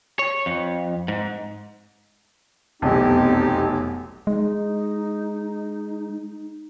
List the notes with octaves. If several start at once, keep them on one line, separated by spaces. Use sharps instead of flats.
C#5
F2
G#2
F1 B1 E2 C4 D#4 G4
G#3 D#4